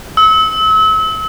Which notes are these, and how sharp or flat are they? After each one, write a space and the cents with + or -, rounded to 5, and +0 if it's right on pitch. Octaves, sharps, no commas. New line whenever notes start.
E6 -35